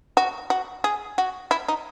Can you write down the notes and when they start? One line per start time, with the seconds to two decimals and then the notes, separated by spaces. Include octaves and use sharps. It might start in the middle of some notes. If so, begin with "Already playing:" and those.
0.17 F#4
0.50 F#4
0.84 G#4
1.18 F#4
1.51 E4
1.68 D#4